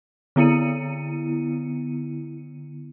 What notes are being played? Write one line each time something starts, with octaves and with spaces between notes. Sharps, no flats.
D3 B3 E4 C#7 D#7